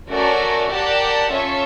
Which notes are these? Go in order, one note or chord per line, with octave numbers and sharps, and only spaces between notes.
A3 C#4 F#4 A#4 D5
G4 A#4 D5 F#5 A5
C#4 F4 A4 C#5 E5